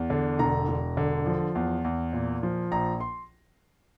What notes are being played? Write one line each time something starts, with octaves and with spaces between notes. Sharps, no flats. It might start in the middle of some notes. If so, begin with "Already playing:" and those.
Already playing: E2
D3
E1 A#5
E1
D3
F3
E2
E2
A#2
F3
A#1 A#5
C6